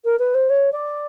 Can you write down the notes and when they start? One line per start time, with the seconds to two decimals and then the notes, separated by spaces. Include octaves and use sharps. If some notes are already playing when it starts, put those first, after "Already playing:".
0.04 A#4
0.19 B4
0.34 C5
0.49 C#5
0.72 D5